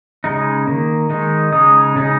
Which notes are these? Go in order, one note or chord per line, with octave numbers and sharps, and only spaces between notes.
C#3 G#3 D#4
D#3 A#3
D#3 G#3 D#4
C#3 G#3 D#4 D#6
C#3 G#3 D#4